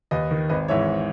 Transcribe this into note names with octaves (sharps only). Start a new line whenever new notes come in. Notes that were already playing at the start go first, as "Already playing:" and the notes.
D#2 B4 D#5
D#3
G#1 B4 D#5
G#2 E3 C#5 E5